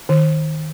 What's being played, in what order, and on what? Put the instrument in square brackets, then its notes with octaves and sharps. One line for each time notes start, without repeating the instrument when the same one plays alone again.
[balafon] D#3